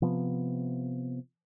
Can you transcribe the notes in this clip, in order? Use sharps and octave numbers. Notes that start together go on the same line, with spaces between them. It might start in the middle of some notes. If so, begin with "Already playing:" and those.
C3 F3 B3